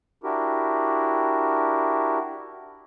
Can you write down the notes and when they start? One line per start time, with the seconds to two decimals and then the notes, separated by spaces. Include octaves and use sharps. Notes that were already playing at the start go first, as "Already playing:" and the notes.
0.24 D4 E4 F#4 G4 A#4